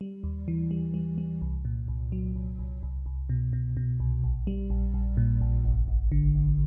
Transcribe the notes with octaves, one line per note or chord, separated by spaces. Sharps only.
G3
D#2
E3
G3
G3
G3
C2
A#2
C2
F#3
C2
C2
C2
C2
B2
B2
B2
C2
A#1
G3
A#1
A#1
A#2
A#1
G1
G1
D3
G1